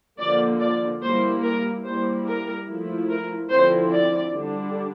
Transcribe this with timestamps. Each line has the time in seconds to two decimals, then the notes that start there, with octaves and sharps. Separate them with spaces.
0.19 D3 F3 A#3 D5
0.60 D5
1.02 G3 A#3 E4 C5
1.43 A#4
1.84 G3 A#3 E4 C5
2.26 A#4
2.67 F3 A3 E4
3.09 A#4
3.50 D3 F3 C4 E4 C5
3.91 D5
4.32 D3 G3 D4